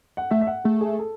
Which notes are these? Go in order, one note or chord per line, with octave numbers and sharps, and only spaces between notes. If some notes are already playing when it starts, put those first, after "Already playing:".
F#5
A3 E5
E5
F#5
A3 G#4
G#4
A4